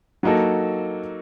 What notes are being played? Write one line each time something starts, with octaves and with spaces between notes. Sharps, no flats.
F#3 A#3 D#4 F#4 A4